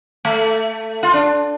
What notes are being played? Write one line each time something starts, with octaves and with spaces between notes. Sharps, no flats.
A3
F4
D4